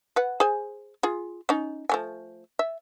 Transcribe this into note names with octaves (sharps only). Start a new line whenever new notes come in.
B4 F#5
G#4 C5 G#5
F4 G#4
C#4 D#4
F3 A3 G#5
E5